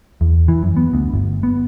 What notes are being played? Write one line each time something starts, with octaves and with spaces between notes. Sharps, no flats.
E2
E3
F#2
B3
D2
G1
B3